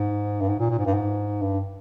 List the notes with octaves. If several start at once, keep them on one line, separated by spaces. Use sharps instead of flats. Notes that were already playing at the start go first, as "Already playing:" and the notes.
Already playing: G#2
G2
G#2
A#2
A#2
G#2
G2
G#2
G2